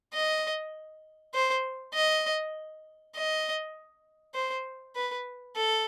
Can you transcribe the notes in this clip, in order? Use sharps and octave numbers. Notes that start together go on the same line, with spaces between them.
D#5
C5
D#5
D#5
C5
B4
A4